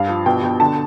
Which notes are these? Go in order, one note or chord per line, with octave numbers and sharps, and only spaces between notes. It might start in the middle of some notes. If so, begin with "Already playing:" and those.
Already playing: G2 F5
F3
B2 G5
B2
D3 A5